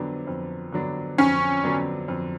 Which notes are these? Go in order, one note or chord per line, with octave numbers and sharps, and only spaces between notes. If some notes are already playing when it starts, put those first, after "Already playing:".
Already playing: F2 D3 F#3 B3 D4
F2
D3 F#3 B3 D4
F2 C#4
D3 F#3 B3 D4
F2